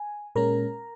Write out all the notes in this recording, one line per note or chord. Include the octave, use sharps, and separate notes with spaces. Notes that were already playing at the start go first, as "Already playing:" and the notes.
Already playing: G#5
A#2 G#3 C#4 A#4 A#5